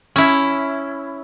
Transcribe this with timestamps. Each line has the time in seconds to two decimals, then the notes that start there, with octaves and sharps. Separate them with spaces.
0.16 C#4 E4